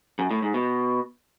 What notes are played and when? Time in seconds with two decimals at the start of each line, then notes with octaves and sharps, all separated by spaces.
0.19 F#2
0.31 A2
0.42 G#2
0.54 B2